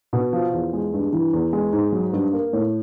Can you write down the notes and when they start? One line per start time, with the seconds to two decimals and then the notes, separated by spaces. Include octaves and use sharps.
0.13 B2
0.33 F3
0.53 E2
0.73 G#3
0.93 G2
1.12 E3
1.33 E2
1.53 G#3
1.73 G#2
1.92 F#3
2.13 G2
2.33 A#3
2.53 A2